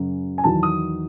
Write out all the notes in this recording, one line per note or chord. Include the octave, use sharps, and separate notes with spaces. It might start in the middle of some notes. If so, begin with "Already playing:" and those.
Already playing: F#2 C#3 F#3 C#4
G#5
E2 D#3 F#3 A5
D#6